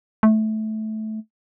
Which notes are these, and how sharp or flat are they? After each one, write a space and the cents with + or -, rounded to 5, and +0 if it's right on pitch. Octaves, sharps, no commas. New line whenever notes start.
A3 -15